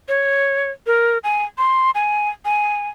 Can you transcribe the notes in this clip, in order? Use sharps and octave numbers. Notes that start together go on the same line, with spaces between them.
C#5
A#4
G#5
C6
G#5
G#5